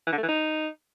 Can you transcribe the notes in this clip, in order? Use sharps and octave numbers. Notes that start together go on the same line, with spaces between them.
E3
D3
A3
E3
D#4